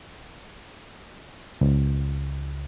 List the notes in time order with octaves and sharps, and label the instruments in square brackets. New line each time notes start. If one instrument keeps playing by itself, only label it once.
[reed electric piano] C#2